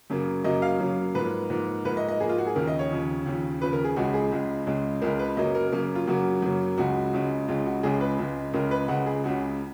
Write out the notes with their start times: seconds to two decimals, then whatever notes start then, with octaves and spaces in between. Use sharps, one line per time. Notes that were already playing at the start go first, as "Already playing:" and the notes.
0.10 F#2 C#3 F#3 A#3
0.44 F#2 C#3 F#3 A#3 D#5
0.62 F5
0.80 F#2 C#3 F#3 A#3
1.15 G#2 F3 A#3 B4
1.50 G#2 F3 A#3
1.85 G#2 F3 A#3 B4
1.97 D#5
2.08 D#5
2.20 G#2 F3 A#3 G#4
2.29 F4
2.38 F#4
2.47 G#4
2.56 D#2 C#3 F3 A#4
2.67 D#5
2.79 C#5
2.91 D#2 C#3 F3
3.25 D#2 C#3 F3
3.61 D#2 C#3 F3 B4
3.73 A#4
3.84 G#4
3.96 C#2 C#3 G#3 F#4
4.14 G#4
4.32 C#2 C#3 G#3
4.67 C#2 C#3 G#3
5.02 C#2 C#3 G#3 A#4
5.19 B4
5.37 F#2 C#3 F#3 A#3 D#5
5.55 A#4
5.72 F#2 C#3 F#3 A#3 A#4
5.95 F4
6.07 F#2 C#3 F#3 A#3 F#4
6.42 F#2 C#3 F#3 A#3
6.77 C#2 C#3 G#3 F#4
7.13 C#2 C#3 G#3
7.48 C#2 C#3 G#3 F4
7.66 F#4
7.83 C#2 C#3 G#3 G#4
8.01 B4
8.19 C#2 C#3 G#3
8.53 C#2 C#3 G#3 A#4
8.71 B4
8.88 C#2 C#3 G#3 F#5
9.06 G#4
9.24 C#2 C#3 G#3 F#4